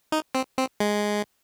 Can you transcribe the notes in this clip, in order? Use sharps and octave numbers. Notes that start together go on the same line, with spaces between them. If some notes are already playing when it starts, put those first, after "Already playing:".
D#4
C4
C4
G#3